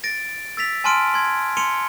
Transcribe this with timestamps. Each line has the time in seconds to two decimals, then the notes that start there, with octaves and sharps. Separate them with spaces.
0.04 A6 A#6 D7
0.57 E6 A6 B6 F7
0.84 G#5 A5 C6 F6 D7 D#7
1.14 C6 G#6
1.57 C6 C#7 D#7 F7 G7